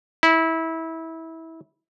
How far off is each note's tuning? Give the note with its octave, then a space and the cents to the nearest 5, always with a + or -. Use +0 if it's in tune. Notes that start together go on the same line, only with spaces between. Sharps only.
E4 -20